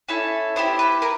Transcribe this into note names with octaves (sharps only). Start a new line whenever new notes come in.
C#4 E4 A4
B3 E4 G4 C5
B4
A#4